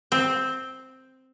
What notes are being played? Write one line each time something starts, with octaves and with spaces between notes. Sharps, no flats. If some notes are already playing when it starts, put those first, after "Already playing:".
C4